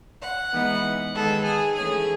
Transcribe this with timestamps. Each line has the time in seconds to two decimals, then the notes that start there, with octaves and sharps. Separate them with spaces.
0.20 F#5
0.52 E3 G#3 B3 D#4
1.14 D#3 G#3 B3 A4
1.46 G#4
1.76 E3 A3 C#4 G#4